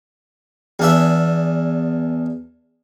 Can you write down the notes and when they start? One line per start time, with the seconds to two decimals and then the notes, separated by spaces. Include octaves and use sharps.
0.79 E2 D4 E5